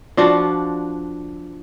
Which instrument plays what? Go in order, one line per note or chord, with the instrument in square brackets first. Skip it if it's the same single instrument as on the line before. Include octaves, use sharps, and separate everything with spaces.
[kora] F3 D4 F4 F#4